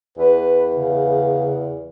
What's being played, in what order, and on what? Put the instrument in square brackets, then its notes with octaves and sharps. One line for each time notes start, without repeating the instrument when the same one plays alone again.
[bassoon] E2 [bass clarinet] B4
[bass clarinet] C#3